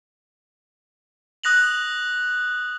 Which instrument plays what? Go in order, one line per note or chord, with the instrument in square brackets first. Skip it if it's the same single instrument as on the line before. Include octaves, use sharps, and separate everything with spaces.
[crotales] D#6 F#6 A#6 F7 F#7